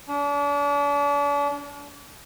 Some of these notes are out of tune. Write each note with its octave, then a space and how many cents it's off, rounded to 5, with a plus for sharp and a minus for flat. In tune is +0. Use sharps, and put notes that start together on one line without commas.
D4 -40